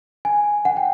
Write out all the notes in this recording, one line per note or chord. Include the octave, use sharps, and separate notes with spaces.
G#5
F#5
G5